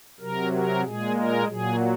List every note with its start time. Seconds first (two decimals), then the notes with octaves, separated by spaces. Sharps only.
0.20 C3 F#3 A#4
0.52 A#4
0.83 A#2 G#3 G#4
1.16 A#4
1.47 A#2 F#3 G#4